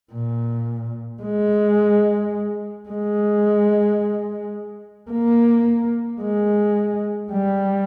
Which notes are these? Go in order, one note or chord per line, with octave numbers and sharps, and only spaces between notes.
A#2
G#3
G#3
A#3
G#3
G3